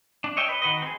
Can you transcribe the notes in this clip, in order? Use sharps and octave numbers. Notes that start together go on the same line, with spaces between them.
D4
C#5 D#5 E5 G5
B4 D#5
D#3 F#4 B4 D#5
C4 G#4